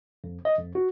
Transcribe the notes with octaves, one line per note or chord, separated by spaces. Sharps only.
F2
D#5
F2
F#4